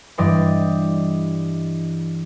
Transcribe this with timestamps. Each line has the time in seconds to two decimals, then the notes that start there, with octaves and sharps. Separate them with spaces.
0.18 G2 E3 D5 D#5 G5 C6